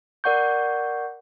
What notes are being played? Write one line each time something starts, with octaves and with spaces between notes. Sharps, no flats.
A#4 D5 F#5 C#6 G6